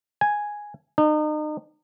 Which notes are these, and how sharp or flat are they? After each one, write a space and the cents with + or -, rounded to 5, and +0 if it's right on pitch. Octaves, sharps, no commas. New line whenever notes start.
G#5 +0
D#4 -35